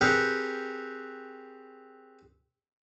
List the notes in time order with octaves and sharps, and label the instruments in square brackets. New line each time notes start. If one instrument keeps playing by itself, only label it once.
[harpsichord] C4 G4 G#4 A#4 B4 C#5